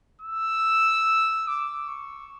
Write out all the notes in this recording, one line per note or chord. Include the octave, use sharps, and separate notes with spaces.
E6
D6
C#6